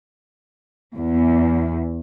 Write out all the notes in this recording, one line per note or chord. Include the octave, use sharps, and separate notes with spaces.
E2